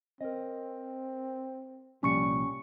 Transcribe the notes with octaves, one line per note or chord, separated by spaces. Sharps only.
C4 A#4 D#5
C2 A#2 F3 G3 C#4 C#6 C#7